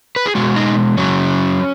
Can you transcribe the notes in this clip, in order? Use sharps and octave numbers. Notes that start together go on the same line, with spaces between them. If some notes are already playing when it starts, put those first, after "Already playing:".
B4
G#4
B2 G#3 F#4
D#4
F#2 C#3 F#3 C#4